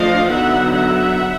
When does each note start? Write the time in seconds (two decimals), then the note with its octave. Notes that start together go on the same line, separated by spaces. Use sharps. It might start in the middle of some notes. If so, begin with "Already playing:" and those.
Already playing: F3 A3 D4 D#5 F5
0.30 D3 F#3 B3 D#4 E5 F#5
0.74 E5 F#5